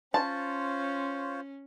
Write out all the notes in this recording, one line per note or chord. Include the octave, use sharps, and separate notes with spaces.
C#4 F4 C5 C#5 A5